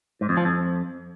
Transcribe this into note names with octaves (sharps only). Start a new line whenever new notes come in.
G#2
F2
F3
F2